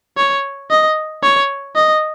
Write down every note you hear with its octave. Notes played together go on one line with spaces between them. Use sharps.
C#5
D#5
C#5
D#5